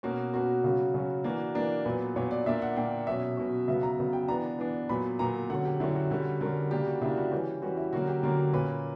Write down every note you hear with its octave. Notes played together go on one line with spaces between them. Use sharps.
B2 A#3 C#4 F#4
B2 A#3 C#4 F#4
C#3 F#3 C#4
C#3 F#3 C#4
E3 A#3 D4 F#4
E3 A#3 D4 A#4
A#2 F#3 B3 B4
A#2 F#3 B3 C#5
D5
A#2 A#3 D4 E5
F#5
A#2 A#3 D4 G5
B2 F#3 C#4 E5
B2 F#3 C#4
C#3 F#3 B3 E5
A#5
C#3 F#3 B3
G5
E3 B3 D4 A#5
E3 B3 D4
A#2 F#3 B3 B5
A#2 F#3 B3 A#5
D3 F#3 C#4 F#5
G4
D3 F#3 C#4 E4
F#4
D3 G3 C#4
D3 G3 C#4 A#4
C#3 G3 A#3 D4 G4
F#4
C#3 G3 A#3 D4 E4
F#4
E3 G3 C#4 G4
E3 G3 C#4 F#4
E4
D3 F#3 A#3 C#4 F#4
G4
D3 F#3 A#3 C#4 A#4
A#2 A#3 C#4 B4